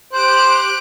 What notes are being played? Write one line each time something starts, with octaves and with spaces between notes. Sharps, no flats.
G4 C5 F#6 D7